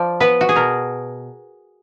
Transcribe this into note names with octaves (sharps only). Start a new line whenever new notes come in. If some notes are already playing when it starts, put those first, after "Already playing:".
Already playing: F3 D5
B3 B4
F#4
G#4
B2 A#4